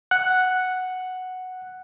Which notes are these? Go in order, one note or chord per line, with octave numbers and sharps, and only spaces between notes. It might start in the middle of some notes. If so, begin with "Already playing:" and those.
F#5 F#6